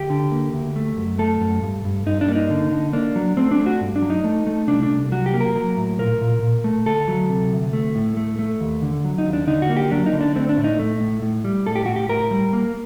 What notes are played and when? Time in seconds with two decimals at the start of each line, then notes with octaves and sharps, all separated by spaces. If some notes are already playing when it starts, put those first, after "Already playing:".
Already playing: D2 G4
0.10 D3
0.31 A#3
0.53 D2
0.76 A3
0.98 F#2
1.19 A3 A4
1.41 F#2
1.62 G2
1.85 G2
2.06 G2 D#4
2.21 D4
2.28 A#3
2.35 D#4
2.50 D3
2.71 D3
2.93 A#3 D4
3.16 F#3
3.37 A3 C4
3.51 D4
3.58 A3
3.66 F#4
3.81 G2
3.96 D4
4.02 F#3
4.10 D#4
4.24 A3
4.47 A3
4.68 C2 D4
4.83 D4
4.90 C2
5.11 F#3 F#4
5.26 G4
5.33 A#3
5.40 A#4
5.56 F#3
5.77 A2
5.99 A#2 A#4
6.21 A#2
6.42 A#2
6.64 A3
6.86 D2 A4
7.08 F#3
7.29 C3
7.51 D2
7.73 A3
7.95 A2
8.17 A3
8.39 A3
8.60 D#2
8.82 D3
9.05 F#3
9.18 D#4
9.27 D#2
9.33 D4
9.47 D3 D#4
9.62 F#4
9.69 A#3
9.76 G4
9.91 F#3 D4
10.06 D#4
10.13 D3
10.21 D4
10.35 A3 C4
10.49 D4
10.57 A2
10.64 D#4
10.79 A3
11.00 A2
11.22 A2
11.44 G3
11.66 A2 A4
11.76 G4
11.86 A2 F#4
11.96 G4
12.09 A2 A#4
12.31 G3
12.53 A#3